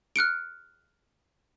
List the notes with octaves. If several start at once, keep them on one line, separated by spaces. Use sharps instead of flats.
F6 F#6 C#7 D7